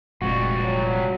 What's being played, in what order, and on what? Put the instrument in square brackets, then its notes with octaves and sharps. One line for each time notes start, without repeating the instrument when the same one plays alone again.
[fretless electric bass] F1 A#2 G#3 [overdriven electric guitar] F2 G3 [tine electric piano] F#4
[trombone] F#3